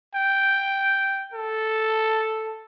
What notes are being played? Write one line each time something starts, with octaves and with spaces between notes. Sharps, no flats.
G5
A4